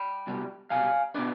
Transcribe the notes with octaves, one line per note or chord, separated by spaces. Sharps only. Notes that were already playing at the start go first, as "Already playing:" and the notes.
Already playing: G5 B5
C2 B2 G3
C2 B2 G3 F5 G#5
B2 B3 D4 B4 D5